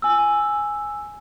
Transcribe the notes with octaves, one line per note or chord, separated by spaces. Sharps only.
G#5 E6